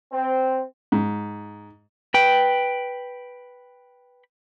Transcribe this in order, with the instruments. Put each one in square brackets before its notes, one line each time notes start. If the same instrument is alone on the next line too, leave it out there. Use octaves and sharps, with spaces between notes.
[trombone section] C4
[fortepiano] G#2
[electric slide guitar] B4 G5